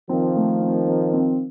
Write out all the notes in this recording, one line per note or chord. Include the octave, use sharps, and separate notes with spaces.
D#3 F3 C4
A3
C4
C4
C4